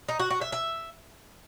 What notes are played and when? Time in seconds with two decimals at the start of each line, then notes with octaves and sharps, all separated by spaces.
0.08 D#4
0.19 F#4
0.30 F#4
0.41 E5
0.52 E5